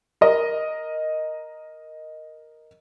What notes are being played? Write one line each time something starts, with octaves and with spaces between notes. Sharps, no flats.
A#4 D#5